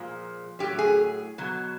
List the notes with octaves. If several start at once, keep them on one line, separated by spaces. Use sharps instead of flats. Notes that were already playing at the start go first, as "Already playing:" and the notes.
Already playing: A#2 F3 G#3
A2 F#3 G4
G#4
B2 F#3